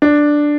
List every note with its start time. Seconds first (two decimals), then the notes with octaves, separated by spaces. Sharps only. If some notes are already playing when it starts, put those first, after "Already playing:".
0.02 D4